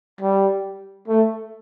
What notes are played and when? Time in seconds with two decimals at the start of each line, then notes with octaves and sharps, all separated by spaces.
0.21 G3
1.08 A3